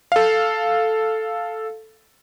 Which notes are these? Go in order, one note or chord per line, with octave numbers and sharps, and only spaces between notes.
A4 F5